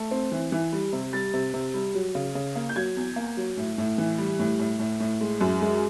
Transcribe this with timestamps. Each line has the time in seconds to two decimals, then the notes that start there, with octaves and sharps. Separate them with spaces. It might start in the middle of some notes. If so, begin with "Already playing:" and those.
Already playing: A3
0.11 C4
0.32 E3
0.52 E3
0.72 G3
0.93 C3
1.13 G3 A6
1.34 C3
1.54 C3
1.74 G3
1.94 F#3
2.15 C#3
2.35 C#3
2.55 A#3
2.69 G6
2.76 F#3 G#6
2.96 E2
3.16 A#3
3.37 F#3
3.57 A2
3.78 A2
3.98 E3
4.18 G3
4.39 A2
4.59 A2
4.79 A2
5.00 A2
5.21 G#3
5.41 F#2
5.61 G#3